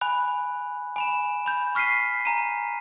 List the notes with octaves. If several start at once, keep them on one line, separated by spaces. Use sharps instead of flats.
G#5 B5 F#6
G#5 B5 E7
B5 G6
C#6 F6 B6 C7 D#7
G#5 A#5 D#7